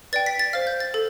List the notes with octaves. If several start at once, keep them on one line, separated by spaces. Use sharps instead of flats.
B4 D5 G5 A6
B6
A6
C5 F5 F6
G6
A6
A4